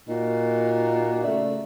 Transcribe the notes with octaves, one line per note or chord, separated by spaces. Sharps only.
A#2 A#3 D#4 F#4
C#3 A3 D5 E5